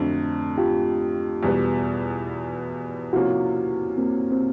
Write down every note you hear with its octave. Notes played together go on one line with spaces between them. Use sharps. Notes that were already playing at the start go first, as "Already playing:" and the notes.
Already playing: F2 D3 F#3 A3 C4 D4
F4 G4
E2 B2 G3 B3
C3 F3 A#3 C#4 E4 F#4
A#3 C4
C4